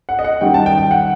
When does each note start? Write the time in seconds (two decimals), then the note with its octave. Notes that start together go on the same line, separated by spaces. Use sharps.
0.09 F#5
0.19 D#5
0.24 F#5
0.41 F#2 D#3 G3 G5
0.54 A5
0.66 G5
0.78 G5
0.91 F#5